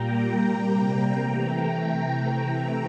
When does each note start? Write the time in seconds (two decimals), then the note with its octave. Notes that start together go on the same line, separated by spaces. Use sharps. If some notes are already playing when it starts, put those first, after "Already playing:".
Already playing: A#2 G3 A#3 G5 A#5
0.44 C3 G3 A#3
1.18 C3 E3 A3 G5 A#5